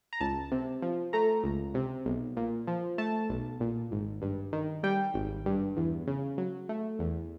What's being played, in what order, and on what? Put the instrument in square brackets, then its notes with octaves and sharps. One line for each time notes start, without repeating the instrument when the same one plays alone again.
[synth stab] A#5
C#2 A5
C3
F3
A3 A#5
C#2
C3
B1
A#2
F3
A3 A5
B1
A#2
G#1
G2
D#3
G3 G5
G#1
G2
E2
C#3
F#3
A3
E2